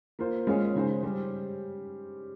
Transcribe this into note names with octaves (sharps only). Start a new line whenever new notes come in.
A#3 F4 C5
G#3 C#4 F4 G#4 C#5
C#3 G#3 D#4 G#4 C5
G3 C#4 G4 C5